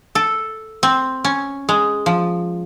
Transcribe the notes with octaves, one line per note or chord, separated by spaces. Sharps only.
A4
C4
C#4
G#3
F3